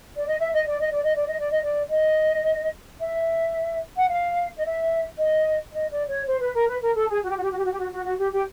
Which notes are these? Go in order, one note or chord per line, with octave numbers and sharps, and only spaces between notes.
D5
D#5
E5
D#5
D5
D#5
D5
D#5
D5
D#5
D5
D#5
D5
D#5
E5
F#5
F5
D#5
E5
D#5
D#5
D5
C#5
C5
B4
A#4
B4
A#4
A4
G#4
F#4
G4
F#4
G4
F#4
G4
F#4
G4
F#4
F#4
F#4
G4
G4